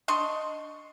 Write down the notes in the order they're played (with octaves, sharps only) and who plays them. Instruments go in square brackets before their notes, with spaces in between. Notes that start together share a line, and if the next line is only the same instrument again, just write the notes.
[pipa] D4 D#5 C6 C#6